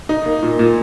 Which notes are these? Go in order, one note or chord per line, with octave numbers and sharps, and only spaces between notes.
D#4
A#3
A#2
A#2